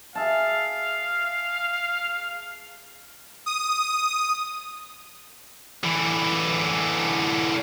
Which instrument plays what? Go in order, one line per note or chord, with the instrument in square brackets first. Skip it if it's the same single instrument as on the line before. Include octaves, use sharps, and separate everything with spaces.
[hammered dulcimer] G#4 E5 A5 [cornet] F5
[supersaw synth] D#6
[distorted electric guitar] D3 E3